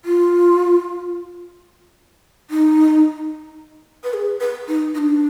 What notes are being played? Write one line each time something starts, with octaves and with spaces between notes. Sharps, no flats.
F4
D#4
B4
G#4
B4
D#4
D#4
D4